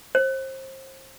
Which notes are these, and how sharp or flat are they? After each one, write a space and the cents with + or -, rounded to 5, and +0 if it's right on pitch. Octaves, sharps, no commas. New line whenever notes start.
C5 +30